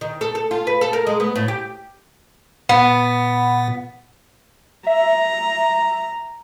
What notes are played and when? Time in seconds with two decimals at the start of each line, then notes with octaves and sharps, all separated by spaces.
0.01 D#3
0.21 A4
0.35 A4
0.51 F4
0.67 B4
0.81 A4
0.93 A#4
1.07 G#3
1.20 B3
1.36 A2
1.48 G4
2.69 A#2 B3
4.87 E5 A#5